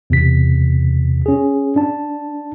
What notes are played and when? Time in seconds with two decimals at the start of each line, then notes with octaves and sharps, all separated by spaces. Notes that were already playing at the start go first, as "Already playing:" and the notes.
0.10 E2 C3 B6
1.26 C#4 G#4
1.76 D4 A5